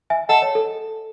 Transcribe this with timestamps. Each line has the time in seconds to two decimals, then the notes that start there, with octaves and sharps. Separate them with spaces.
0.10 E5 G#5
0.29 A4 D#5 F#5
0.42 C#5
0.55 A4